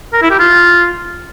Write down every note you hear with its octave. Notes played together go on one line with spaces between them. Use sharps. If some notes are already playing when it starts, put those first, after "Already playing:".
A#4
E4
G4
F4